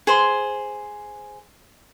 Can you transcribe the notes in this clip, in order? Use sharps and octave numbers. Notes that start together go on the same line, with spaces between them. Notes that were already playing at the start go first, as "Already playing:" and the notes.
G#4 C5 C6